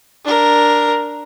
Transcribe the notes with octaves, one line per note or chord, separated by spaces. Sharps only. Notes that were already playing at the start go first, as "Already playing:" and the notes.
D4 A#4